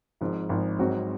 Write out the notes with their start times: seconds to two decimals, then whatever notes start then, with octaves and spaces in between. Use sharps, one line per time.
0.21 G#1 G#2 F3
0.49 G#1 G#2 F3
0.79 G#1 G#2 F#3 C4 F#4